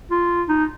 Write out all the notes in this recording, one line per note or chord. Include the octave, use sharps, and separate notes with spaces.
F4
D#4